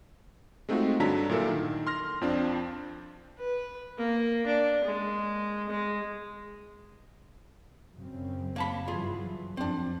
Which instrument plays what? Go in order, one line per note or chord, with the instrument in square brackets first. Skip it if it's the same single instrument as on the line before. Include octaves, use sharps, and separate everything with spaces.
[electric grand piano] G#3 A3 C4 D#4 F4 F#4
G2 D3 F#3 A5 A#5 B6
A#2 E4 A4 A#4
D#3
C6 F6 A#6
F2 F3 C4 D4
[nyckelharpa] B4
A#3
D4
G#3
G#3
[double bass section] F#2 C#3 C4
[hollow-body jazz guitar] A#3 A5 B5
[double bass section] G2 E3 F#3 [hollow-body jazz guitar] F4 G#4
[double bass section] F2 [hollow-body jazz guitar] C4 D4